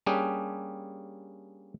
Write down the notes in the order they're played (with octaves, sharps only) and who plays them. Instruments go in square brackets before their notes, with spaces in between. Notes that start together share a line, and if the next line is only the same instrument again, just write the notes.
[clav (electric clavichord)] G3 A#3 C#4 D4 G4 G#4